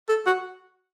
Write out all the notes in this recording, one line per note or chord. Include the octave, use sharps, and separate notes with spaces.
A4
F#4